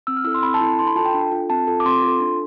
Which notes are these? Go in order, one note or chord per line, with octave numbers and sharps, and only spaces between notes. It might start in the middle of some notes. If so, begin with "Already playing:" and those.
C4 E6
F6
E4 A4 E6
C6
C4 B5
A5
E4 A4
D4 C6
B5
F4 A4 A5
G5
D4
F4 A4
C4 A5
F4 A4
D6
C4 C6
F4 A4
D4